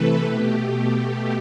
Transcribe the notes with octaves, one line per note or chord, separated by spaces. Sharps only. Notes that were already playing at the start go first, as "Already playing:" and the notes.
Already playing: C3 E3 A3 A4 B4
B2 A3 G4
G4